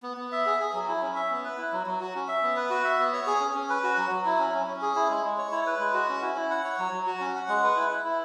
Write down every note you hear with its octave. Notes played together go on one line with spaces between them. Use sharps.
B3
B3
E5
G#4
G#4
F#3
E4
C#4
E5
B3
B4
E4
F#3
F#3
F#4
C#4
E5
B3
B4
F#4
E5
B3
C#5
G#4
C#4
C#4
B4
F#4
F#3
F#3
E4
C#4
C#4
C#4
G#4
E4
G#3
G#3
C#5
E4
B4
G#3
F#4
C#4
E4
E4
F#5
C#5
F#3
F#3
F#4
C#4
F#5
G#3
B4
E4
E4
E4